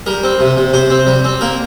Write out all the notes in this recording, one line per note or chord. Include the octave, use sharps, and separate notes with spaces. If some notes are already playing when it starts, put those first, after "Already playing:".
G3 A#4
C4
C3
C3
C3 C5
C4
G3
C4
A#3 A#4